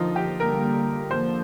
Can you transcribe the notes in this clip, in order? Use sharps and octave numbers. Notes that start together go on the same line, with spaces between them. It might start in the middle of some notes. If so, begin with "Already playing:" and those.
Already playing: D3 F3 A#3 D#4 F4
G4
D3 G3 A#3 A#4
D3 F3 A#3 C5